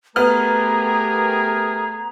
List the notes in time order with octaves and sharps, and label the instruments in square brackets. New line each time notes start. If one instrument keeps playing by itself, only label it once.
[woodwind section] A3 G#4 [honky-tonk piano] B3 F6 [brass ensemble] G4 A#4 [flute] A#5